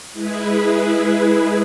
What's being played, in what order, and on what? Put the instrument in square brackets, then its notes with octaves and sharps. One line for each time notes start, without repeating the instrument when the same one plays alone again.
[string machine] G#3 E4 G#4 B4